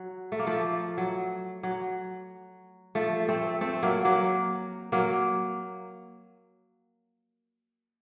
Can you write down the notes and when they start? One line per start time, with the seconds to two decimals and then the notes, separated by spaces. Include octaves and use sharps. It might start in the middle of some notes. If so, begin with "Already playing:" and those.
Already playing: F#3
0.32 A3
0.39 A#3
0.46 F3 A3
0.98 F#3
1.63 F#3
2.95 F3 A3
3.28 A3 C4
3.61 A3 C4
3.83 F#3 A#3
4.05 F#3 A#3
4.92 F#3 A#3